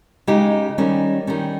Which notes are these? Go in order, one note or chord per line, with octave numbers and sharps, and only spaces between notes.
C#3 G#3 D#4 G4
D#3 G3 C#4
D#3 G3 C#4